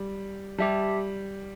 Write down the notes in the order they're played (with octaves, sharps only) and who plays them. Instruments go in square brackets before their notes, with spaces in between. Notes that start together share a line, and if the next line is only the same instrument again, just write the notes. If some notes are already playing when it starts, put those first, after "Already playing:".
Already playing: [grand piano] G3
[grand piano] G3 [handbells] G4 E5 A5